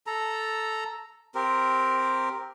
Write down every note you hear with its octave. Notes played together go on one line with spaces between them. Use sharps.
A4 A#5
C4 G4 A#4